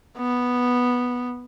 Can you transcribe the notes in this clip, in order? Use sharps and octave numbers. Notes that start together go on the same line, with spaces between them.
B3